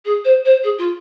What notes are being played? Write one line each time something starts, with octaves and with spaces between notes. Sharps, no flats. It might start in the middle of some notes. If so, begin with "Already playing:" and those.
G#4
C5
C5
G#4
F4